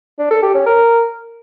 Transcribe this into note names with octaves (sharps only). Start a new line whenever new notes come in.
D4
A4
G4
C#4
A#4